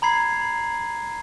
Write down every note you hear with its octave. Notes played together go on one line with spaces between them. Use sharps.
A#5 B5 G#6 C7